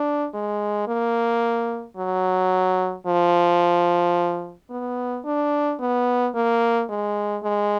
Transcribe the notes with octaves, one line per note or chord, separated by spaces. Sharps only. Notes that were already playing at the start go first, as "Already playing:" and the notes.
Already playing: D4
G#3
A#3
F#3
F3
B3
D4
B3
A#3
G#3
G#3